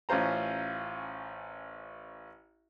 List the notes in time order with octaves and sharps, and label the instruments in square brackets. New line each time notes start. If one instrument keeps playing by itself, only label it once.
[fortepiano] A1 C#4 F4 C5 A#5